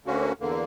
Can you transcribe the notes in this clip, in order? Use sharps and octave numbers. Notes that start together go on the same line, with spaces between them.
D2 D3 A#3 C#4 F#4
E2 D3 A#3